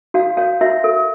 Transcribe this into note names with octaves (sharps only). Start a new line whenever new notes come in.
F#4 F5
C#5 F5
F#4 E5
A4